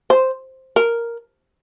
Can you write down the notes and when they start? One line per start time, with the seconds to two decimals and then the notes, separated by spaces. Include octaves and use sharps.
0.10 C5
0.76 A#4